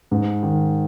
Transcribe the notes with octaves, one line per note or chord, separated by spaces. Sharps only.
G#2
D#3